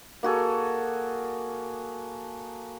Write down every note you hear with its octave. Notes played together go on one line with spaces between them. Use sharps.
A#3 F#4 G#4 A4